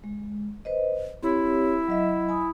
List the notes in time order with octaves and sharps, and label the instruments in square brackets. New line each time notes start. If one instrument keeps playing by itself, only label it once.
[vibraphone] G#3
B4 C5 D#5
[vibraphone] C4 G4 C#5 [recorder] E4
[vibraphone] F#3 D#5 E5
G#5 B5 D#6